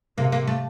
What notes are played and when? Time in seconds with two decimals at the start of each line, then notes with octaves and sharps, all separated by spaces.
0.17 C3 A#3
0.32 A#3
0.47 A3